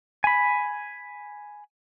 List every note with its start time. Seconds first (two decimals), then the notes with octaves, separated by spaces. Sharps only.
0.24 G#5 B5